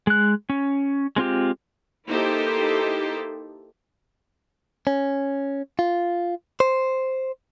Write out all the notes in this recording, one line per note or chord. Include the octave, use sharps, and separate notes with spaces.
G#3 F#6
C#4
G#3 C4 F4 G4
A#3 D#4 E4 G4 A4 C5
C#4
F4
C5